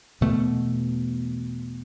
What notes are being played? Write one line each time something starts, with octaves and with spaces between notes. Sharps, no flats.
E2 B2 A3